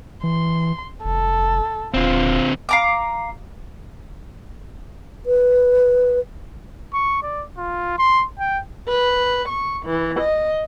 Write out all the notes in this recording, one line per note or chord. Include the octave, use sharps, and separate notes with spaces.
E3 C6
F1 A4
D#1 D3 C4 F4
F5 A#5 D6
B4
C#6
D5
F4
C6
G5
B4
C#6
E3
D#5